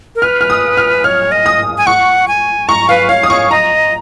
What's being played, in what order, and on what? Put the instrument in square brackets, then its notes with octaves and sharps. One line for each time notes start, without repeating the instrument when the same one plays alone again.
[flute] A#4
[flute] B4 [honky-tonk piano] F6
[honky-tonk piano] F6
D#6
F6
[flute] C#5 [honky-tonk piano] F6
[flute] D#5
[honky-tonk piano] D#6
[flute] G#5
[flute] F#5 [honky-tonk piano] C#6
[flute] G#5
[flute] A#5 [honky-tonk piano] C#6
[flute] B4 [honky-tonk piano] F5
[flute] C#5 [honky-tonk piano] F5
[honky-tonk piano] D#6
[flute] C#5 [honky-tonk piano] C#6
[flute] D#5 [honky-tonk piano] A#5